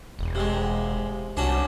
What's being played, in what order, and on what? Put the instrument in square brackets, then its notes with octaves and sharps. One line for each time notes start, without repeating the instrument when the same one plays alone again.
[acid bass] E1
[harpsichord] C3 G#3
[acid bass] C2 [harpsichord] C#4 D4 F#4